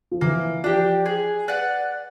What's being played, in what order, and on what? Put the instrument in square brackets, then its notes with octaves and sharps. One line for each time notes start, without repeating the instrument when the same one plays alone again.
[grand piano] F3
[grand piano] E3 [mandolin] A#3
[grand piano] F3 [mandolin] D4 G4
[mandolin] G#4
B4 D5 F#5